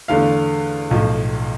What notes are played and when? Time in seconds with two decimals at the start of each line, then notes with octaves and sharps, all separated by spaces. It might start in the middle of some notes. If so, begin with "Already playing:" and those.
0.08 E2 D3 A3 F5
0.91 B1 A2 F3